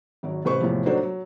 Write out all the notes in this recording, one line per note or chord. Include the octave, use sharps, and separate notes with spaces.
G#1 F#3
A1 C3 B4 C5 C#6
E2 A2 C3 F3
F#3 A3 D4 D#4 F#4 C5
F#3